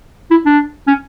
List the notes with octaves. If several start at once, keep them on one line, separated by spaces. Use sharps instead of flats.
E4
D4
C#4